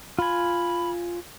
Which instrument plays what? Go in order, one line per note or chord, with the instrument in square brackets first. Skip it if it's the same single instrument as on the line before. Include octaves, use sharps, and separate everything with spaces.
[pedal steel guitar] F4 G#5 [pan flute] B5